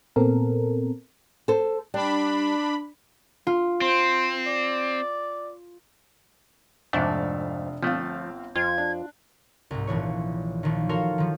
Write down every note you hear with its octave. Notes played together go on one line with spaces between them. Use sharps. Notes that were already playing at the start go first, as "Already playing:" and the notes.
A#2 B3 C4 A4 A#4
A4 C5
G3 D4 B5
F4
C4 C5
D5
F1 F2 G#2 A3 D4 E5 F5
G1 F3 A3 C4 F5
F2 F4 G#6
D4
C2 G#2
D#1 A#1 E3 C#5
A#1 D#3
F#4 A4 A#4 C#5 F5 C6
D#3 F3